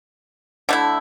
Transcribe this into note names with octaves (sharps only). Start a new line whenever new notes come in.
D3 A3 E4